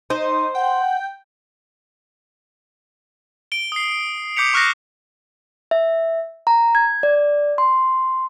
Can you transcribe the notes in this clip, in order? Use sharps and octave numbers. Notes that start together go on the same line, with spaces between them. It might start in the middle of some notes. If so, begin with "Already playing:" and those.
D#4 C5
F#5 G5
D7 G7
D#6 C7
D6 G6 B6 C#7 F7
C#6 F6 F#6 A#6 C7
E5
A#5
G#6
D5
C6